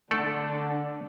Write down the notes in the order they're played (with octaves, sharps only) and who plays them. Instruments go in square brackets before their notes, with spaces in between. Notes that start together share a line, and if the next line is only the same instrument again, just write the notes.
[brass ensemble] D3 [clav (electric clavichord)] A3 A4 D5 [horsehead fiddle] D4